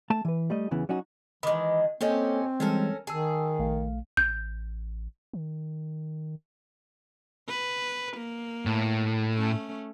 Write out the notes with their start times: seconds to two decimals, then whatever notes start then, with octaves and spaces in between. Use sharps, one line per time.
0.10 A3 A5
0.25 E3 B4
0.50 G3 A3 D#5
0.71 E2 C#3 E3 B3
0.89 F#3 C#4 D#4 F#4
1.43 D#3 E3 G#3 B5 D6
2.01 G#3 A#3 C4 C#4 G4 A4 C#5
2.60 E3 G3 G#3 C#4 A4 A#4
3.07 D#3 G#4 G#5 A5 E6
3.59 A#1 A3 F5
4.17 A1 G6
5.33 D#3
7.48 B4
8.17 A#3
8.66 A2
9.34 A3 C#4